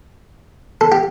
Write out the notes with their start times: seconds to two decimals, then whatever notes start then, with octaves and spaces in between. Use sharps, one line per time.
0.81 A4
0.92 G4